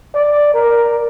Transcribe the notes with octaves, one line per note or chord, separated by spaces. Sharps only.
D5
A#4